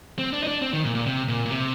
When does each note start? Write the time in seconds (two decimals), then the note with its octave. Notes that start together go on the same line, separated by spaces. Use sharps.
0.19 C4
0.33 D4
0.43 D#4
0.47 D4
0.62 C4
0.73 D#3
0.85 A#2
0.95 A#2
1.06 C3
1.28 A#2
1.45 A#2
1.50 C3